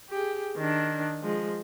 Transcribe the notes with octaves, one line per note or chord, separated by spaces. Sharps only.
G4 G#4
D#3 D4
F3 G#3